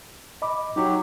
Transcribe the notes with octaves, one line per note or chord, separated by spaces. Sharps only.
D#5 B5 D6
F#3 D#4 G4